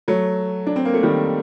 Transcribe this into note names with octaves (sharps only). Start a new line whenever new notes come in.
F#3 A3
D4
C4
A#3
A3
D#3 G3